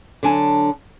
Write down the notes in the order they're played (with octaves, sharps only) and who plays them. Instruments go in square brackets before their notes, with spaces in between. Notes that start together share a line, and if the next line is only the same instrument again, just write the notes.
[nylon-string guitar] D3 F#3 D4 G#5 A5